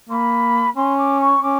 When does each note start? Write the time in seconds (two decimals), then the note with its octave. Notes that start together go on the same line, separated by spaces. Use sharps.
0.09 A#3 C6
0.12 B5
0.76 C#4 C6
0.97 D6
1.20 C#6
1.42 C#4 D6